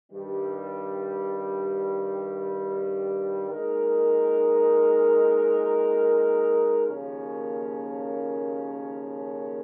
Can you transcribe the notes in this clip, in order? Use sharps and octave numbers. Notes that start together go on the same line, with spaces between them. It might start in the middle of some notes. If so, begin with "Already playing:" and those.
G2 D#3 G3
A#2 G#3 D#4 A#4
D#2 C#3 F3 A#3 C#4